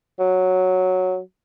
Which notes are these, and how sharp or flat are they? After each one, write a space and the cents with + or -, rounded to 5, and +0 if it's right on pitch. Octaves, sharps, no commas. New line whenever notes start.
F#3 -5